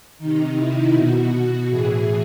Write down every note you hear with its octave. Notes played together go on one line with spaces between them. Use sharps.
C3 D#3 D#4
E4
B2 F#4
A2 E3 G#4